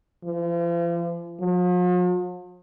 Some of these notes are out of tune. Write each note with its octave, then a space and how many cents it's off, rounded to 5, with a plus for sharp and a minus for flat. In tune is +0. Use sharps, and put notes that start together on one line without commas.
F3 -40
F3 +45